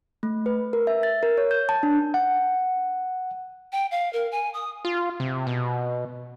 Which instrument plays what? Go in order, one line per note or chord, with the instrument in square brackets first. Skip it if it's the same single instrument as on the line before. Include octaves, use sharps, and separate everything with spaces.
[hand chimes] A3
B4
A#4
E5
A6
A#4
C#5
G6
A5
D4
[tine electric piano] F#5
[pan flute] G5
F5
A#4
G#5
D#6
[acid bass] F4
C3
B2